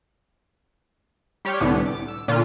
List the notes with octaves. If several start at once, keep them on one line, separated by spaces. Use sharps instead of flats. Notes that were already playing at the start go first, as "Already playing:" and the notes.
G3 G4 C#5 C6 F6 B6
C2 A2 D3 B3
D6
E6
A#2 D3 F4